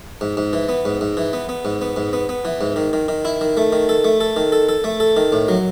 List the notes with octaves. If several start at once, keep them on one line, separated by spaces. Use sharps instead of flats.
G#2
G#2
E3
B3
G#2
G#2
E3
B3
B3
G#2
B3
G#2
B3
B3
E3
G#2
D#3
D#3
D#3
E4
D#3
A3
D#3
A4
A3
A4
D#3
A4
A4
A3
A4
D#3
A2
F#3